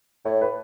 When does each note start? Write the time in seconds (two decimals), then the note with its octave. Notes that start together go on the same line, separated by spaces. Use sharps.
0.25 A2 C#5
0.41 B4